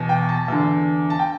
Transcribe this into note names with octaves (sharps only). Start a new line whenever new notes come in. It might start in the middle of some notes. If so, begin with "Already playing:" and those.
Already playing: E2 B2
G5
A5
E2 D3
A5
G5